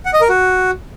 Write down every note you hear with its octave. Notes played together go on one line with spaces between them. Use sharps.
F#5
D#5
A#4
F#4